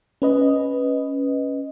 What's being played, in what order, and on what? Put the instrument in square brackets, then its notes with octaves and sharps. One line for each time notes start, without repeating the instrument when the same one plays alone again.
[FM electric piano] C#4 B4 D#5